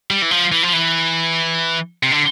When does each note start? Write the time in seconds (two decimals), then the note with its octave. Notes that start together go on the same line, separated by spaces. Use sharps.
0.10 G3
0.22 E3
0.31 F3
0.52 E3
0.63 F3
0.73 E3
2.03 C3
2.12 D3